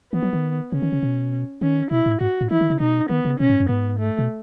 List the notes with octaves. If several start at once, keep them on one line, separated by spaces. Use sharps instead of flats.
E3 B3
F#3
D#3
C#3 C#4
D#3
C#3
B2
D#3 C#4
B2 E4
A2
G#2 F#4
A2
E3 E4
D#3
C#3
B2 D#4
D#3 B3
C#3
B2 C#4
G#2
F#2
G#2 B3
A3
B2